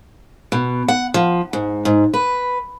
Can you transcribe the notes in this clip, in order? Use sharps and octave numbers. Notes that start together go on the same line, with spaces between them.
B2
F#5
F3
G#2
G#2
B4